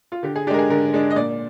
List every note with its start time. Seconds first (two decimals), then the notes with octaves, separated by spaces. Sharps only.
0.12 F4
0.23 D3 G4
0.36 G#4
0.47 D4 G4
0.50 G#3 A#4
0.59 G#4
0.70 D3 A#4
0.93 G#3 D4
1.10 D#5
1.16 A#2 D5